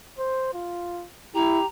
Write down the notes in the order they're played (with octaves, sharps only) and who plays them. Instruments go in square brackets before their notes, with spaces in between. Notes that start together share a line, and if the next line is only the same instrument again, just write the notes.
[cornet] C5
F4
[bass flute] E4 [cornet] G4 [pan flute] A#5